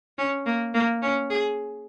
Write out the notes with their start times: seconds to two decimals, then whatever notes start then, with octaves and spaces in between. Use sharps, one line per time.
0.18 C#4
0.46 A#3
0.74 A#3
1.02 C#4
1.30 G#4